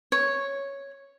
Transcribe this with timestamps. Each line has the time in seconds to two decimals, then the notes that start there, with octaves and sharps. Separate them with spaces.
0.12 C#5